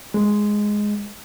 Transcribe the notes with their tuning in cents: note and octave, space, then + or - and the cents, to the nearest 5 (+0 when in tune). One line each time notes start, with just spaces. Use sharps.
G#3 +0